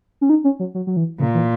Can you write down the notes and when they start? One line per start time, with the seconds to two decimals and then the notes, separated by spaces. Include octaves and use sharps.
0.21 C#4
0.29 D#4
0.44 C#4
0.60 F#3
0.75 F#3
0.87 F#3
0.97 E3
1.19 A#2 C#3
1.34 E3